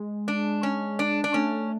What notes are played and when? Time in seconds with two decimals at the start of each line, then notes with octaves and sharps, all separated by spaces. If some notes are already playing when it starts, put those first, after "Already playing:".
Already playing: G#3
0.28 D4
0.63 C#4
0.99 D4
1.24 D4
1.34 A3 C#4